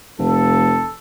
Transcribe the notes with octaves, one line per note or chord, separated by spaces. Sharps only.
F1 A4